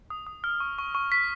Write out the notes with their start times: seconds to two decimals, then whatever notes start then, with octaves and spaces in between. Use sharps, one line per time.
0.10 D#6
0.27 D#6
0.44 F6
0.60 C#6
0.78 C#6
0.95 C#6
1.12 C#6 B6